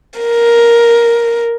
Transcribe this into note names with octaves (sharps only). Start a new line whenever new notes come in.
A#4